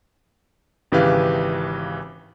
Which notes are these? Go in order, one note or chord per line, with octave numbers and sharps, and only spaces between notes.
G#1 C#3 E3 G4 B4 F5